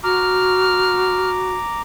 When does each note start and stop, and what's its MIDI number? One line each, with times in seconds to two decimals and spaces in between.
0.04 1.54 66
0.04 1.82 82
0.04 1.82 86
0.04 1.30 89